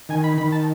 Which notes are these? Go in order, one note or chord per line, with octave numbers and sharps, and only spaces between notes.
D#3 G#5
B5
D#3 B5
A5